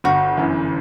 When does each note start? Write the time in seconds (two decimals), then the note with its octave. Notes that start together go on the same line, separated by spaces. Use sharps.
0.04 G1 F#4
0.37 F#2 E3